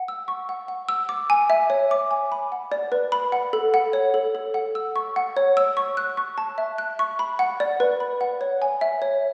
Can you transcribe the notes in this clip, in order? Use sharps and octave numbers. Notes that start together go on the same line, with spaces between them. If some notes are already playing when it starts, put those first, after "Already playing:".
Already playing: F#5
E6
C#6
F#5
F#5
E6
D6
G#5
E5
C#5
D6
G#5
B5
F#5
D5
B4
B5
F#5
A4
F#5
C#5
A4
A4
F#5
E6
C#6
F#5
C#5
E6
C#6
F#6
C#6
A5
E5
F#6
C#6
B5
F#5
D5
B4
B5
F#5
C#5
G#5
E5
C#5